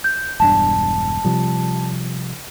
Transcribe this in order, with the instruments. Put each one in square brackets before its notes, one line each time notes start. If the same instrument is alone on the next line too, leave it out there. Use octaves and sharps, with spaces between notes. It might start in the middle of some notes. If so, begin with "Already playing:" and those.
[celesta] G6
[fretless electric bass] E1 G2 D4 [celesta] A5
[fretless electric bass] C3 F3 G3